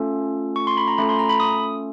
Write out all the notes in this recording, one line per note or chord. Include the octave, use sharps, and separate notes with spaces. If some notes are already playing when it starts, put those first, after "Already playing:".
Already playing: A3 C#4 F4 A4
C#6
C6
B5
A#5
A3 C#4 F4 A4 B5
C6
A#5
B5
D#6